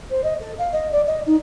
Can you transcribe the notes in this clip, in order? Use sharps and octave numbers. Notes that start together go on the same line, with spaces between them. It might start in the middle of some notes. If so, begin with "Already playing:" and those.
C5
D#5
A4
F5
D#5
D5
D#5
D#4